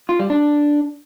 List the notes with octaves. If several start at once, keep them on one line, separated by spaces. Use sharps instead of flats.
F4
G3
D4